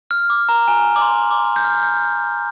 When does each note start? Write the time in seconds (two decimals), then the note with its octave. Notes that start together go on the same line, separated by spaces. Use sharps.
0.11 F6
0.30 D6
0.49 A#5
0.68 G#5
0.96 D6
1.02 C6
1.16 D6
1.31 D6
1.44 D6
1.56 G6
1.64 F6
1.83 G6